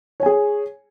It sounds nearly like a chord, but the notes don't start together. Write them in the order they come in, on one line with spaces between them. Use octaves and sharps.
C#5 G#5 G#4